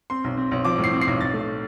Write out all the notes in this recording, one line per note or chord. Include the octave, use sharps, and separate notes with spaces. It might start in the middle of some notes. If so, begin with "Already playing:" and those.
C4 C6
B1
C4
B1
F3 D6
A2
C7
C4
C7
B1
B1 A6
A3